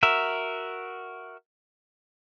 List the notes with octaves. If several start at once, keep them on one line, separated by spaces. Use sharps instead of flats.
F#4 A#4 E5